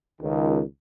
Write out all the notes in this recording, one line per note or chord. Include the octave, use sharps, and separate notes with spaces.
C#2 D#3